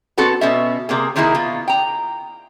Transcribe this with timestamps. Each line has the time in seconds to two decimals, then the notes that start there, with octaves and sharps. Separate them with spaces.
0.18 B3 C4 F#4 A4
0.41 B2 C#4 E5
0.89 C3 A#3 G#4
1.16 C3 D#3 A#3 E4 G#4
1.35 B2 F4
1.68 G5 A#5